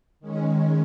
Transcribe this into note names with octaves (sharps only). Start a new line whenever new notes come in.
D#3 G#3 C#4